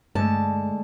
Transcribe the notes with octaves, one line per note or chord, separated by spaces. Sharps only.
G2 D3 G#3 A3 A5